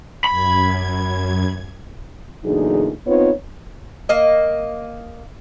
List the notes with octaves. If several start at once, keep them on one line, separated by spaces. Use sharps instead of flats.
F#2 B5 G#6
E2 A#2 D3 F#3 D#4 G#4
B3 C4 D#4 F4 B4 C#5
A#3 D#5